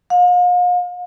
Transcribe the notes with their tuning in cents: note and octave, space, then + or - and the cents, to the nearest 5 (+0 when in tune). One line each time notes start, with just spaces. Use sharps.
F5 +40